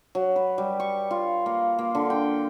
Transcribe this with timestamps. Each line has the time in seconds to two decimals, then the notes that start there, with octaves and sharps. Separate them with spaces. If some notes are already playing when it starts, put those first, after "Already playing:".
0.15 F#3
0.36 B4
0.58 G3
0.80 C#6
1.11 F4
1.46 A#3
1.79 A#3
1.95 D3
2.10 G5